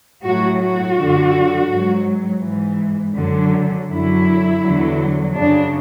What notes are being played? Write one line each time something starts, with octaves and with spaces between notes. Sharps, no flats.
A2 F#3 F#4
F#4
F#2 D3 F#3
G#2 F#3
G#2 E3
F#2 D3 F#3
F#2 D3 F#3 E4
E2 D3 F#3
F#2 C#3 F#3 D4